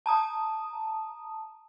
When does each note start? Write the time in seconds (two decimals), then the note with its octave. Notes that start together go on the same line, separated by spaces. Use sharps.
0.06 A5 A#5 D#6